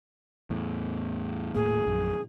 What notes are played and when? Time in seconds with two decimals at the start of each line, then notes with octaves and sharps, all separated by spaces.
0.50 E2 A2
1.55 D#1 A2 A#3 G#4
1.86 A#1 F#2